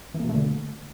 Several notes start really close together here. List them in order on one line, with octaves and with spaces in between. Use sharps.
E3 A#3 B2 A3 D3